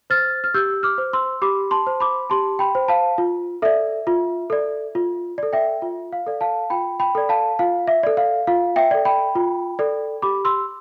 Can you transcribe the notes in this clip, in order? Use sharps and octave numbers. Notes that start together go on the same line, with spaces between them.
C5 F6 A6
F6
G4 E6 G6
D6 F6
C5
C6 E6
G4 B5 D6
A5 C6
C5
B5 D6
G4 A5 C6
G5 B5
C5
F5 A5
F4
A4 D5 E5
F4
A4 D5
F4
A4 D5
E5 G5
F4
F5
A4 D5
F5 A5
F4 G5 B5
G5 B5
A4 D5
F5 A5
F4 F5
E5
A4 D5
F5
F4 F5
E5 G5
A4 D5
G5 B5
F4
A4 D5
G4 B5 D6
C6 E6